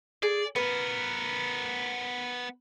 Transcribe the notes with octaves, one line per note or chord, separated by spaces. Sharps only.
G#4 D5
B3 A#4 B4